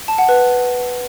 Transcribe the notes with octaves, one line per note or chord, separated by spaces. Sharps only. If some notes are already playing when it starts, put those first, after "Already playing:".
A5
F#5
B4